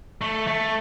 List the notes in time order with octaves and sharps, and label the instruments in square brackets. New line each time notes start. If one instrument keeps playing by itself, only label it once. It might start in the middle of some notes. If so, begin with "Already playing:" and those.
[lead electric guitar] A3
A3